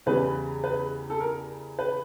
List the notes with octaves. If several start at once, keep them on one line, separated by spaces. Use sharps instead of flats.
E2 C#3 E3 G3 B4
B4
A4
A#4
B4